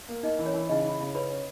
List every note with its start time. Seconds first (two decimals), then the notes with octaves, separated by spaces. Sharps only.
0.09 A#3
0.23 A#3 D#4 D#5
0.39 E3
0.46 C#4 C#5
0.54 E3
0.69 C#3 D#4 D#5
0.85 E4
1.00 C#3
1.15 C#4 B4 B5
1.30 C#4